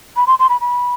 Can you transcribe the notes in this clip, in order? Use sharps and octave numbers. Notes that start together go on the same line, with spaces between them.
B5
C6
C6
B5
B5